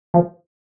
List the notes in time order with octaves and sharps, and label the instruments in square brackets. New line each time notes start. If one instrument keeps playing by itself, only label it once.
[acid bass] F3